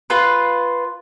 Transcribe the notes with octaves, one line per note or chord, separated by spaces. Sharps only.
F4 B4